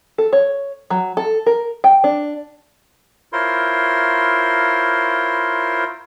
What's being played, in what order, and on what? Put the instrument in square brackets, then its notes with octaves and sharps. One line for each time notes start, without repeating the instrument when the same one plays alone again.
[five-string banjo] A4
C#5
F#3
A4
A#4
G5
D4
[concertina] E4 F4 A#4 C5 C#5 C6